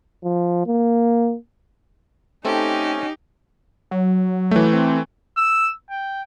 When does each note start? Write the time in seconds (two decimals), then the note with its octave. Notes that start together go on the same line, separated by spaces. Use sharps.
0.24 F3
0.67 A#3
2.45 A3 C4 C#4 D#4 G4 A4
3.91 F#3
4.51 E3 A3
4.73 C4
5.37 E6
5.90 G5